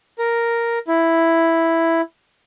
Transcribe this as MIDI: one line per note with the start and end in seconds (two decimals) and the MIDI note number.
0.18 0.79 70
0.87 2.01 64